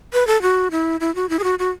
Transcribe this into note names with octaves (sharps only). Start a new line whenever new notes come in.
B4
A4
F#4
E4
E4
F#4
E4
G#4
F#4
F#4